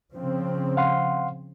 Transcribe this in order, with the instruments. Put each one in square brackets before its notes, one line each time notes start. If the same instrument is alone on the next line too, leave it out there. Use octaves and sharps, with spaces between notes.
[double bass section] C#3 F3 C4
[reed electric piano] F5 F#5 C6